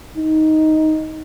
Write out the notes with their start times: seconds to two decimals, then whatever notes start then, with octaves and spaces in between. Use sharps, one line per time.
0.17 D#4